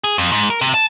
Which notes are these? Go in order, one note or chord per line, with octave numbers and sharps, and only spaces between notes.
G#4
F2
G#2
A#4
C3
A5